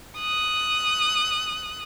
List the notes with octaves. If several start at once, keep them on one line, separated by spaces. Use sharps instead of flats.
D#6 F#6